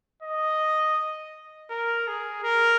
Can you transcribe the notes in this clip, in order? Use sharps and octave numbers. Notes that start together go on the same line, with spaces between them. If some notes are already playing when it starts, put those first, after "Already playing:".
D#5
A#4
G#4
A#4